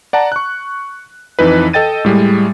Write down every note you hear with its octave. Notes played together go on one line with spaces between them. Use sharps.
D5 F#5 A5 A#5
C#6 F#6
F2 E3 D#4 B4
A4 D#5 G5 A6 D#7
A2 G3 G#3